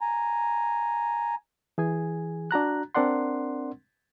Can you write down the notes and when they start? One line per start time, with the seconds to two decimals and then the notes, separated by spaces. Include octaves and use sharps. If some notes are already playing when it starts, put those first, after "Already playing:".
0.01 G#5 A#5
1.78 E3 G#4 G#5
2.51 D4 F#4 A#5 F#6
2.95 C4 D4 A#4 D5 F#5 C6